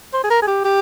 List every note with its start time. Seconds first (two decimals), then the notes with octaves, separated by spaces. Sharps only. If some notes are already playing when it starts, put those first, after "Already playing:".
0.13 C5
0.24 G#4
0.30 A#4
0.42 G#4
0.47 G4
0.64 G4